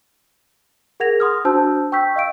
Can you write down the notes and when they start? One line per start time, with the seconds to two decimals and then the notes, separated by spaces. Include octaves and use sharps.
1.00 G#4 A#4 F#5 G#6 A#6 F7
1.20 C6 D#6 F6
1.45 D4 F#4 C5 A5 E6 G6
1.92 G5 C#6 E6 G6 B6
2.16 D#5 F5 E6 D7